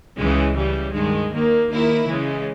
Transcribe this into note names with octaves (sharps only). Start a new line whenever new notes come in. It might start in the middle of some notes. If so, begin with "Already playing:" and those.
C#2 C#3 E3 G#3
C#3 E3 G3
G2 D#3 G#3
D#2 D#3 A#3
D#2 D#3 A#3 E4
C#3 E3 G#3